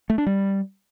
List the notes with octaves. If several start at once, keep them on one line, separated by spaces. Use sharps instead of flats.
A3
D4
G3